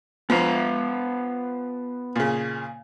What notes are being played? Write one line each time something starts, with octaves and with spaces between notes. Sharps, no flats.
F3 B3 F5
A#2 C#3